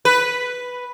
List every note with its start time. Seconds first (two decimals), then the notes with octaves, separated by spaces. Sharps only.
0.05 B4